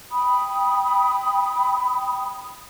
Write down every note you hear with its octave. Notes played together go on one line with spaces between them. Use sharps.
G5 B5 D#6